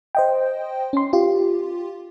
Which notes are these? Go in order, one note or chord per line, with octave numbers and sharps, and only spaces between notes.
C5 D#5 G5
C#4 C6
F4 G4